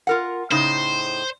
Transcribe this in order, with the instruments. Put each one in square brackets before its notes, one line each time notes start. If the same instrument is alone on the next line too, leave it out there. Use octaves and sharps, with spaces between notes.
[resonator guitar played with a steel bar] F4 A#4 F#5
[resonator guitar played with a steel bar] A2 C#3 D#4 [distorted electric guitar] C5